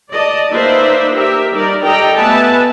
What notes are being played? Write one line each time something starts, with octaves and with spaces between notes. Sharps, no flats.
D5 D#5 A5
A#3 D#4 B4 C5 D5 E5
G4 A#4 E5
G3 D#4 A#4 D5
G4 A4 D5 D#5 G5 A#5
A3 B3 B4 E5 G#5 A5